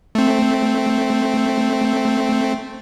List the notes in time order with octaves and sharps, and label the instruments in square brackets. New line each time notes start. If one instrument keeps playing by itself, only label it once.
[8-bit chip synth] A3 C4